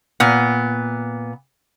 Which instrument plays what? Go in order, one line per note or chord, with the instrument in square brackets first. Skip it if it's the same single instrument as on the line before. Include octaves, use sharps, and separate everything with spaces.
[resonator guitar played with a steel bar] A#2 B3